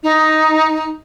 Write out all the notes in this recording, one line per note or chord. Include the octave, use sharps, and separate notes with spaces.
D#4